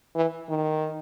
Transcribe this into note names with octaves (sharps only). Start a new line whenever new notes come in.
E3
D#3